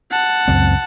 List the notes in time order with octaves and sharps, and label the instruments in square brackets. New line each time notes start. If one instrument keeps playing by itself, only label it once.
[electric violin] F#5 A5
[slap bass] C#2 F#2 C4